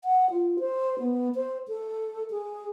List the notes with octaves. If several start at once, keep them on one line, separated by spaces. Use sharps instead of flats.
F#5
F4
C5
B3
C5
A4
G#4